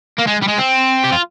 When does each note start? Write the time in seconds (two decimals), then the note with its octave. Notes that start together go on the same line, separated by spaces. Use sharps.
0.18 A#3
0.27 G#3
0.42 G3
0.48 G#3
0.58 C4
1.04 G4
1.12 F4